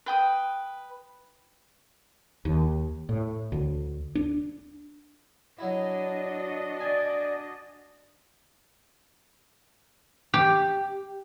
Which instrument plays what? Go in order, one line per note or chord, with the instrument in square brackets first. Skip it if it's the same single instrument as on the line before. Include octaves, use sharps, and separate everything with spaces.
[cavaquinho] B4 G5 D#6
[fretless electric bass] D#2
A2
D2
D4
[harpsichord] F#3 E4 [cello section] D4 F#4 D#5
[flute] D5 [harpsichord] G#5 D#6
[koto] G4